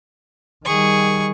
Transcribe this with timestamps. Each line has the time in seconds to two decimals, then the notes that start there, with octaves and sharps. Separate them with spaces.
0.65 D#3 G3 G#4 C#6